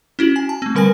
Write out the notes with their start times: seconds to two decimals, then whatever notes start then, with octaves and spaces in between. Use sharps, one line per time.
0.19 C#4 E4 F#4 F#7
0.36 G#5
0.49 A5
0.62 A3 C4
0.75 D3 G3 A#4 B4 G#5 A#6